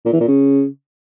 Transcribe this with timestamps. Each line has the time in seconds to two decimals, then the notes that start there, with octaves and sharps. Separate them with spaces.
0.05 A#2
0.13 E3
0.20 A#2
0.28 C#3